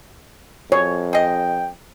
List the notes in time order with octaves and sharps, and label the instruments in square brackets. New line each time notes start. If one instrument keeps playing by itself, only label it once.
[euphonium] F2 [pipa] G#4 [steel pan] C#5
[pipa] G#4 D#5 [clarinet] G5